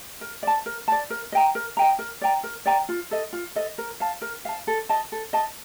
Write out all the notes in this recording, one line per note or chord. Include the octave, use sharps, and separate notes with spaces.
A#4
D5 A5
A#4
D5 A5
A#4
D#5 G5 A#5
A#4
D#5 G5 A#5
A#4
D5 G5 A#5
A#4
D5 G5 A#5
F4
A4 D#5
F4
A4 D#5
A#4
F5 A5
A#4
F5 A5
A4
D#5 A5
A4
D#5 A5